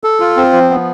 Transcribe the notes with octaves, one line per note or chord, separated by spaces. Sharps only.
A4
F4
C4
F3
B3